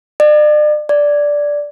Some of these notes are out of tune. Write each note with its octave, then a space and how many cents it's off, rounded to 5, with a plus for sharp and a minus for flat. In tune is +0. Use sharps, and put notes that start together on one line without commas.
D5 +40
D5 -5